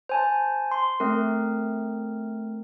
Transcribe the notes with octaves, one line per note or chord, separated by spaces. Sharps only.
C5 G#5 A5
C6
A3 C4 A#4